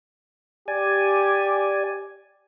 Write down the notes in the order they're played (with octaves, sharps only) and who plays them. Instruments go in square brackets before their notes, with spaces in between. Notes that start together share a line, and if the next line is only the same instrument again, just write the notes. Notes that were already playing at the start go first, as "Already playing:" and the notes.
[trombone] G4 [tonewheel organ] D5 G#5